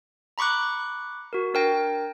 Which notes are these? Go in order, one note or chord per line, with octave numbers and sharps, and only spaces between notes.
A#5 B5 C#6 D6 F#6
F#4 A#4
D4 A#4 G5 A#6